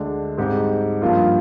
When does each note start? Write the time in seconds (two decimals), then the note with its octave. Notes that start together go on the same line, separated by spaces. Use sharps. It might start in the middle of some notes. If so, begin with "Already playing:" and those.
Already playing: D2 D3 G#3 D4
0.37 G#2 G3 C4 D#4 G4
1.02 G2 F3 A#3 F4